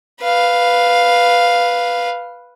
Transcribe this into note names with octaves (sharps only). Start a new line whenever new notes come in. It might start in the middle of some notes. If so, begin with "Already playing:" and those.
B4 F5